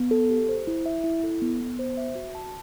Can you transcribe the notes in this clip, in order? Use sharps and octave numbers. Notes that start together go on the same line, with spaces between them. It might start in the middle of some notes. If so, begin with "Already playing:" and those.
Already playing: B3
A4
G4
C5
E4
E5
E4
A4
B3
B3
C5
E5
F#4
A5